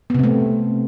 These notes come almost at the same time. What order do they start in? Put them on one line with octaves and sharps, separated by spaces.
B3 C3 C4 A3